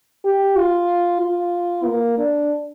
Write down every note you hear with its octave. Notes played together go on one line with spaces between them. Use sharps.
G4
F4
F4
A#3
D4